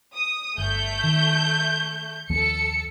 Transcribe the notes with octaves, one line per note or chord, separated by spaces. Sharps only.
D#6
G1 A3 G6
D#3
D#2 F3 B3 A4 C#7